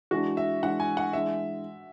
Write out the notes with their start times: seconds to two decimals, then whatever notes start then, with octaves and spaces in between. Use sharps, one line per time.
0.11 E3 G#3 D4 F#4
0.37 E5
0.63 E3 G#3 D4 F#5
0.80 G#5
0.97 F#5
1.13 E3 G#3 D4 E5